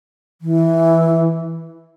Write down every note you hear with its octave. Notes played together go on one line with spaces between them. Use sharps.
E3